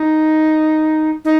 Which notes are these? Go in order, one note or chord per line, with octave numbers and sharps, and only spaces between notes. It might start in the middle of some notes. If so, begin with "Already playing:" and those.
Already playing: D#4
D#4